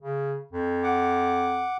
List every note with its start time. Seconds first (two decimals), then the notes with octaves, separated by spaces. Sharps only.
0.02 C#3
0.53 F2
0.83 F#5 D6